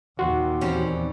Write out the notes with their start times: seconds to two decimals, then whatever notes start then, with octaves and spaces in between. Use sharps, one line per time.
0.19 D#2 A#2 F#4 C6
0.61 E2 G3 C4 C#4 C5